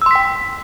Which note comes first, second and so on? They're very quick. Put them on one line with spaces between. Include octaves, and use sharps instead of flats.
E6 C6 B6 G5